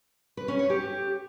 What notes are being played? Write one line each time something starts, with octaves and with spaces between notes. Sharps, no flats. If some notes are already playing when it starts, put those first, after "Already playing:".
B4
C#4
C#5
G4